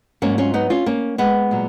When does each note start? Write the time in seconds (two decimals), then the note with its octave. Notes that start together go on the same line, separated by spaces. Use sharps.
0.22 G#2 F#3 A#3 C#4
0.38 C#4 F4
0.54 B3 D#4
0.70 C#4 F4
0.86 A#3 C#4
1.18 G#3 B3
1.51 A#2 F#3